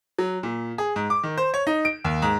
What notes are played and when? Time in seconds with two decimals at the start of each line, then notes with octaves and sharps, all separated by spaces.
0.18 F#3
0.43 A#2
0.78 G#4
0.96 G#2
1.10 D6
1.23 D#3
1.38 C5
1.54 C#5
1.67 D#4
1.85 D7
2.05 D#2
2.22 G#2